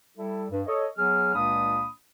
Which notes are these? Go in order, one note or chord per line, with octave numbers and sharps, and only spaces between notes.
G3 E4 A4
G2
A4 C#5 D#5
F#3 B3 G#4 F6
C#2 A#2 A#3 D4 B5 D#6